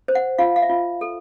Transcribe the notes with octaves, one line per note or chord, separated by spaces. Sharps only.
C5
F#5
F4 F5
F5
E5
F4
A4